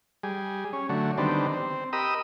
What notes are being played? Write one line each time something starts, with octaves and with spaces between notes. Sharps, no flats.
G3 G#4
C#4
D3 F#3 A3
D3 D#3 G3 B3 C4 D4
C4
G4 A#4 D#5 B5 D#6 E6